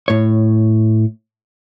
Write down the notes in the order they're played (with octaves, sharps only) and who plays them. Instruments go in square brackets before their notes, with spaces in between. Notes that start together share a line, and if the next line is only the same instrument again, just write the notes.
[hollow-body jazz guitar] A2 C#5